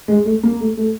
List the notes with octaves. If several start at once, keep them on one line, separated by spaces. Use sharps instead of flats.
G#3
A3
A#3
A3
A3